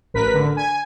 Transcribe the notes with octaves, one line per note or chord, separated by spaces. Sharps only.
A1 A#4 B4 B6
D3
G#5